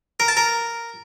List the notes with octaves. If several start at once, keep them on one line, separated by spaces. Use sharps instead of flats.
A#4
A5
A#4